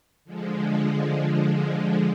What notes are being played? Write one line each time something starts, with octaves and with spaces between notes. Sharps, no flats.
D3 F3 G#3